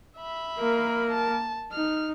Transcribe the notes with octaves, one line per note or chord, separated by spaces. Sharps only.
E5 B5
A#3 A#4
A5
D#4 F6